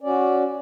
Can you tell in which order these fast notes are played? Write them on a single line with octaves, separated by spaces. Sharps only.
C#4 D5 F#4